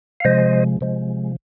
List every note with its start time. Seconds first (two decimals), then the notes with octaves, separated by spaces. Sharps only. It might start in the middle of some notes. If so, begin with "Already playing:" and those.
0.20 F5
0.25 C3 F3 G#3 C5 D#5
0.81 C3 F3 G#3